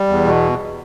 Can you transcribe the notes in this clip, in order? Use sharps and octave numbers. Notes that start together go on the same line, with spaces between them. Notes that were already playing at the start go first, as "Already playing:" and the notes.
Already playing: G3
E2
B2